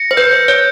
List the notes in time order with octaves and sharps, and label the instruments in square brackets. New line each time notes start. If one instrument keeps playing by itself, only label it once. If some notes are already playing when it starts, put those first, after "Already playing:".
Already playing: [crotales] A#6 C#7
[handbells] C5
[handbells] B4 [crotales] G6
[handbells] C5
[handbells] C#5 [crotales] G6